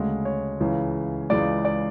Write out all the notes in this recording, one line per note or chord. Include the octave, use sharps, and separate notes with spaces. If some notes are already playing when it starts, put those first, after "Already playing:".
Already playing: D2 C#3 G#3
C#5
C#2 C#3 E3
C#2 C#3 E3 G#3 D5
D5